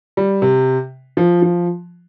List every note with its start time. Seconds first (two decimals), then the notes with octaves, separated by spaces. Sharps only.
0.17 G3
0.42 C3
1.17 F3
1.42 F3